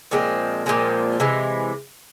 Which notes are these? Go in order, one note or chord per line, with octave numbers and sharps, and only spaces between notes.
A#2 F3 G#3 C4
A#2 F3 G#3 C4
C3 E3 G#3